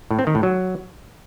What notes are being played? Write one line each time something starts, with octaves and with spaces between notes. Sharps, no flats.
A2
C4
D#3
A2
F#3